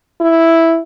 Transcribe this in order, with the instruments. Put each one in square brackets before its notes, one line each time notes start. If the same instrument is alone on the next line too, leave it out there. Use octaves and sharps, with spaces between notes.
[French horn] E4